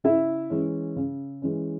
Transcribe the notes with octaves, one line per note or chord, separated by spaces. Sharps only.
C#3 E4 E5
E3 G#3 C#4
C#3
E3 G#3 C#4